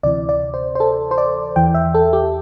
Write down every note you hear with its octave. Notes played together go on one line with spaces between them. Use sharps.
D2 C3 E3 D5
D5
C5
C5
A4
C5
D5
E2 E3 G5
E5
A4
G4